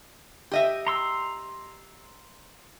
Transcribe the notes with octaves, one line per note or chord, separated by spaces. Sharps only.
G4 D#5 E5
A#5 C6 E6